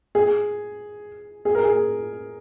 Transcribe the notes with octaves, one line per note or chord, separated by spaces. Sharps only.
G#4
G#4
A#4
G#4